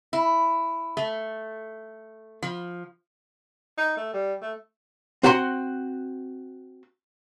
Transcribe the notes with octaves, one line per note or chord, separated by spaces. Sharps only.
E4
A3
F3
D#4
A3
G3
A3
C4 F#4 F#5 A#5 C6